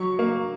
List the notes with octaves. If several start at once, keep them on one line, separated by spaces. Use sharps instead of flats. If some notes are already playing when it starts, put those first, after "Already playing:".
Already playing: F#3 C#6
A#3